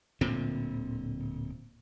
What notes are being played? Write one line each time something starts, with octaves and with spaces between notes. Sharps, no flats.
D1 A#2 D3 C4